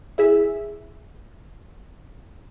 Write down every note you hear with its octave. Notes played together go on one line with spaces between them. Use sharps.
E4 G#4 E5